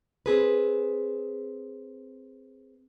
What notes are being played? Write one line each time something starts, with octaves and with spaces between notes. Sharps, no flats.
C4 G#4 B4